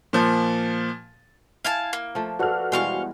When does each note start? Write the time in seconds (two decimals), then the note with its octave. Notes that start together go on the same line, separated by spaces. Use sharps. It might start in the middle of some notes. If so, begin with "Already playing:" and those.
0.13 A#2 F3
1.65 E4 F5 G#5 A5
1.93 A#3
2.15 F3 A3
2.39 F#4 A4 B4 D5 F#5 F6
2.72 B2 E3 G3 G#3 C5 F5 C#6